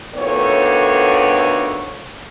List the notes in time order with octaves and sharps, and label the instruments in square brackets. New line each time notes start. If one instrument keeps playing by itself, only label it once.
[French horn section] D2 D3 D#3 F3 B3 C#5